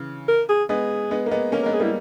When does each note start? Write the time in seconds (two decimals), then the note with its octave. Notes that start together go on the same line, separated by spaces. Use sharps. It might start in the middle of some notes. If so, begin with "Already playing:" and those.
Already playing: C#3 E3
0.28 A#4
0.49 G#4
0.69 G#3 B3 G#4
1.11 G#3 B3
1.26 A#3
1.31 G#3 B3
1.52 A#3 C#4 A#4
1.63 A#4
1.66 G#3 B3
1.74 G#4
1.80 G3 A#3 E4